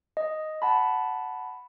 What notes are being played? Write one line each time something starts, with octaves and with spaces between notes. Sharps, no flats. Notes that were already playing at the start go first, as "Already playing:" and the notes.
D#5
F#5 A5 B5